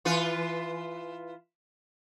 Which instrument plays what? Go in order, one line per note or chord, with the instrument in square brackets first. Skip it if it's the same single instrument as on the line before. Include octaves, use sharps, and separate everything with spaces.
[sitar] E3 F4 B4